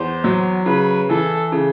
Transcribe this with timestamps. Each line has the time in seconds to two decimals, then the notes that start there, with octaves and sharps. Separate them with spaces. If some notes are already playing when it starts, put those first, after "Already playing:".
Already playing: E2 C5
0.24 F#3
0.66 C#3 B4
1.09 E3 A4
1.52 C#3